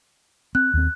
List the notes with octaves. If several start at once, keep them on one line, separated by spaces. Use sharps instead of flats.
C4 F#6
D#2 C4